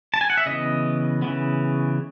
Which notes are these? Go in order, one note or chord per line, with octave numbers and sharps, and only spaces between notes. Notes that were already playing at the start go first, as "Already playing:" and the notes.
A5
G#5
F#5
E5
C#3 E3 B3 D#5
C#3 E3 B3